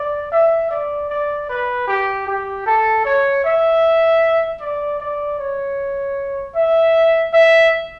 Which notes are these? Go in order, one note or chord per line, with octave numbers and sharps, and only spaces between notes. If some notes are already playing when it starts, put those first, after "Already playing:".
Already playing: D5
E5
D5
D5
B4
G4
G4
A4
C#5
E5
D5
D5
C#5
E5
E5